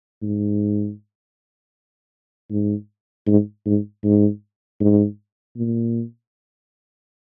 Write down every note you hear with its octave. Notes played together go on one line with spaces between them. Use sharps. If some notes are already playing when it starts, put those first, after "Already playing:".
G#2
G#2
G#2
G#2
G#2
G#2
A#2